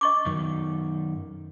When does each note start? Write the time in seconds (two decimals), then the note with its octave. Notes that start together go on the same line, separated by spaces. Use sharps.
0.01 D#5 C#6 D6
0.26 F#2 D#3